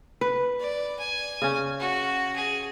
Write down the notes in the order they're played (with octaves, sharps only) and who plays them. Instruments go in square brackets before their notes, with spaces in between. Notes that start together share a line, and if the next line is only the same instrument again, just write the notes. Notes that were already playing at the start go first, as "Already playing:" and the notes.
[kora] B4
[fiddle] D5
G#5
[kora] C#3 C#4
[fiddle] F#4
G#4